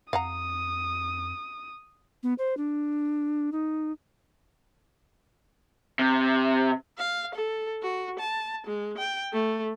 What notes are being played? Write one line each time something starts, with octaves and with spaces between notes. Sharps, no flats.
F2 F5 F#5 A#5 D#6
B3
C5
D4
D#4
C3
F5
A4
F#4
A5
G#3
G5
A3